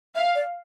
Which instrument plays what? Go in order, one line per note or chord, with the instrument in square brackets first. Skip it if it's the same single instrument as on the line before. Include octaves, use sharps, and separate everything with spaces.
[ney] E5 [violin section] F5
[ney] D5